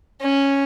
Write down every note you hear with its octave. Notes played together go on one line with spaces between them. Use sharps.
C#4